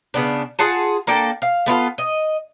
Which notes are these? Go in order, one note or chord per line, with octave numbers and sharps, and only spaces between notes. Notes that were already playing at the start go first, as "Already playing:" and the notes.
C#3 B3 D4
F4 G#4 F#5 A5
A#3 D4 A4 G5
F5
A3 B3 F4 A4
D#5